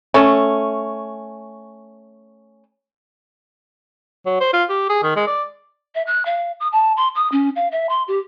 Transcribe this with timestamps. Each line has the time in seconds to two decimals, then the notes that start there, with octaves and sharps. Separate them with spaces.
0.14 A3 C#4
4.26 F#3
4.40 C5
4.53 F4
4.69 G4
4.89 G#4
5.03 D#3
5.16 G#3
5.27 D5
5.95 E5
6.07 F#6
6.26 F5
6.60 D#6
6.72 A5
6.97 C6
7.15 D#6
7.32 C#4
7.56 F5
7.72 E5
7.89 C6
8.08 G4